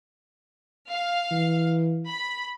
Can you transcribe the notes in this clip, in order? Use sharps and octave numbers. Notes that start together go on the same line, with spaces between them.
F5
E3
B5